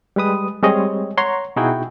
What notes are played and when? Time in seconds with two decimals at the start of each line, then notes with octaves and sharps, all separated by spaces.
0.16 G3 G#3 B4 D#6
0.63 G3 G#3 C4 G#4 C#5 D#5
1.18 C#5 F#5 A#5 C6
1.56 B2 D#4 E4 F#4 G#4 G5